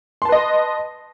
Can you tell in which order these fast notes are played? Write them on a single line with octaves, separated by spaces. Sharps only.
C6 A5 B4 D#5